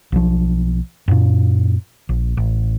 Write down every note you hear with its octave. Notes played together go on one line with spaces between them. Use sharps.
B1 F3
F#2 A#2
A#1
A1